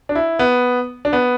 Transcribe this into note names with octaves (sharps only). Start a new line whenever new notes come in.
D4
E4
B3
D4
B3